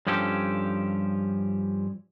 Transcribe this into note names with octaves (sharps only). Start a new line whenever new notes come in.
G2 F3 C#4 G4 A4